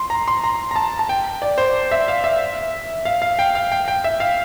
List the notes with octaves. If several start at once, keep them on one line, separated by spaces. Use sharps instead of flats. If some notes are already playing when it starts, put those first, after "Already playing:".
Already playing: C6
A#5
C6
A#5
A#5
A5
A5
G5
D5
C5
E5
F5
E5
F5
F5
G5
F5
G5
G5
E5
F5